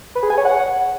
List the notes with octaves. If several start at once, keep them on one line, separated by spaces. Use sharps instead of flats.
B4
G#4
G#5
C#5
F#5